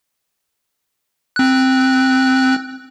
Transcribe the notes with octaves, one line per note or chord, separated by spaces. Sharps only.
C4 F#6